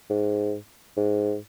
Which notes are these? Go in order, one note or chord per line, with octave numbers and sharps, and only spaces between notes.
G#2
G#2